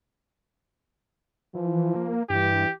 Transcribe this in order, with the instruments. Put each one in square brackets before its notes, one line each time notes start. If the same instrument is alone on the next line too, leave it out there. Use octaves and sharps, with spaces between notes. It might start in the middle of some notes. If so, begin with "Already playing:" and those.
[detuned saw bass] E3 [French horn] F3
[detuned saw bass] A#3
[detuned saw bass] G2 [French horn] E3 [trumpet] G4